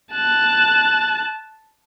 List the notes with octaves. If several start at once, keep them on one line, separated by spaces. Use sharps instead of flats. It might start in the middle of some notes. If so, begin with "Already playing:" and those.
A5 F#6